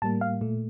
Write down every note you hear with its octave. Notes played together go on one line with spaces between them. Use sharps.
A2 G3 A#3 A5
F5
A#2 A3